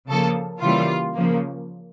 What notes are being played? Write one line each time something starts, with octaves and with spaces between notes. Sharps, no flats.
C#3 F3 A#3 A4
C#3 E3 G3 A#3 F4
C#3 F3 A#3